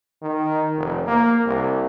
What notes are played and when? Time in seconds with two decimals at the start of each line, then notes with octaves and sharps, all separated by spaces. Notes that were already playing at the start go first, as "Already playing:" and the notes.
0.22 D#3
0.77 F1
1.07 A#3
1.46 C2